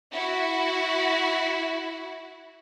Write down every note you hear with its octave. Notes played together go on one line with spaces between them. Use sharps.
E4 F#4